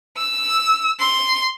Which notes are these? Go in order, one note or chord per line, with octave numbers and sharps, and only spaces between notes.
E6
C6